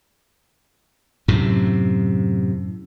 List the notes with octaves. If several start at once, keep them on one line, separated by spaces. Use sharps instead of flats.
F#2 A2 C3